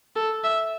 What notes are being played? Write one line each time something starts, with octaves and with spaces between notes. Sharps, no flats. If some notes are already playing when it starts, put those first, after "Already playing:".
A4
E5